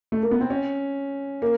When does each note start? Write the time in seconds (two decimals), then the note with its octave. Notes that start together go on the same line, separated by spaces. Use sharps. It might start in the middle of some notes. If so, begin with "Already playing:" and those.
0.12 A3
0.23 A#3
0.31 B3
0.41 C4
0.50 C#4
1.42 A#3